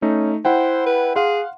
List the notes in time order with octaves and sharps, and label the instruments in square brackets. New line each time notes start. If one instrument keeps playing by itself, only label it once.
[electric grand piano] A3 D#4 [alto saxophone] C#4
[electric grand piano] E4 F#5 G5 [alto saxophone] C5
[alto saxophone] B4
[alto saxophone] G#4 [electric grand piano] F5 F#5 C6